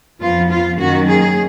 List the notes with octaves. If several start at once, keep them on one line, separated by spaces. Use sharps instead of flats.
F2 F3 B3 F4
F4
F#2 D#3 A#3 C#4 F#4
G#4